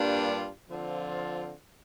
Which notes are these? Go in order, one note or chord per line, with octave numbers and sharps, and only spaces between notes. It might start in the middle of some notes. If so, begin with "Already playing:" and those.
Already playing: G2 G3 A#3 D4 F4
D3 F3 C4 F4